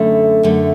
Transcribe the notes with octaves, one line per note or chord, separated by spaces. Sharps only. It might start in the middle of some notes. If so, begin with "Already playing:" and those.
Already playing: F#2 D3 A3
F#2 D3 A3